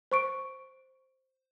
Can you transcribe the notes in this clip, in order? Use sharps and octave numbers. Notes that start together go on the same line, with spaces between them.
C5 C#6 D7